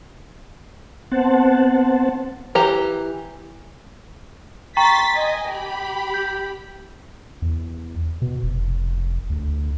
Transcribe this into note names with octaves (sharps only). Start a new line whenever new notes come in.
B3 C4 C5 F#5 A5
E3 G4 A#5
G5 A#5 C6 C#6 A6 B6
D#5 G#5
G4 B5
G6
E2
B2
F1
D2